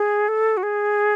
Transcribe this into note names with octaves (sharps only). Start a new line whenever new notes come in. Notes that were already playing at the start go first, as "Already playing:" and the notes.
Already playing: G#4
A4
F#4
G#4